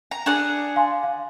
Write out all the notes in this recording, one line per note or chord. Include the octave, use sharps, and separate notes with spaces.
A#5
D4 G#4 F#5
F5 G#5 C6
F5